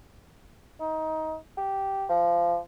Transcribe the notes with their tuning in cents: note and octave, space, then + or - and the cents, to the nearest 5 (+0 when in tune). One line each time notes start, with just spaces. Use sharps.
D#4 +20
G4 -10
F3 -20